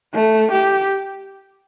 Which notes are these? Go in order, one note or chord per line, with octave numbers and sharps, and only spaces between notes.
A3
G4